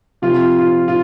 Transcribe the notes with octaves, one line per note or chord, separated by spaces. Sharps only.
C3 F3 F4
F4
F4